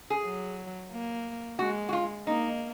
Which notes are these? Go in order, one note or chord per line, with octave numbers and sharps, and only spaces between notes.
G#4
F#3
A#3
G#3 F#4
F#4
F4
A#3 D#4